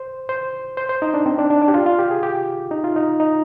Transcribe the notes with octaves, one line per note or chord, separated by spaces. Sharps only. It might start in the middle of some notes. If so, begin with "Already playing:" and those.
Already playing: C5
C5
C5
C5
D#4
D4
C4
D4
D4
D4
G4
F4
F4
G4
G#4
G4
D#4
F4
D#4
D#4